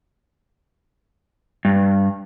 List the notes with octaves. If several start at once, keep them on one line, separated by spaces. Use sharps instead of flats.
G2